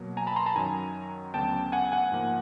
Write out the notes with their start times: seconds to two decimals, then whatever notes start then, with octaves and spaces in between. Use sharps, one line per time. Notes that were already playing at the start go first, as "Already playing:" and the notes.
Already playing: B2 F#3 A#3
0.17 G#5 A#5
0.27 A5 B5
0.36 A#5 C6
0.46 A5 B5
0.56 F#2 D#3 F#3 G#5 A#5
1.34 D2 C#3 F#3 B3 G5 A5
1.72 F#5 G#5
1.92 F#5 G#5
2.12 G#2 F3 A#3